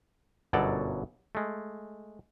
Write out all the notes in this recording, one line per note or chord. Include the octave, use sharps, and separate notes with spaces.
G1 F#2 B2 F#3 A4 D5
G#3 A3